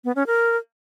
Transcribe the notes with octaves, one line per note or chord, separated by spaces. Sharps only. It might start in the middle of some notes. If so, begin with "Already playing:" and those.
B3
C#4
A#4